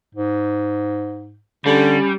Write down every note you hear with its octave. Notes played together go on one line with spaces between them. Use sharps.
G#2
D3 G3 C#4